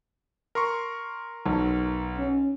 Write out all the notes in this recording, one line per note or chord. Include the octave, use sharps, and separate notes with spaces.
A#4 C6 C#6
B1
C#4